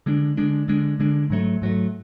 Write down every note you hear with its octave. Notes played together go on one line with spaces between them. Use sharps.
D3 G#3 D4
D3 G#3 D4
D3 G#3 D4
D3 G#3 D4
G#2 F#3 A3
G#2 F#3 A3